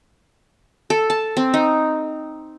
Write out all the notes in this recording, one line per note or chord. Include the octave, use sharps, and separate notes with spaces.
A4
A5
C4
D#4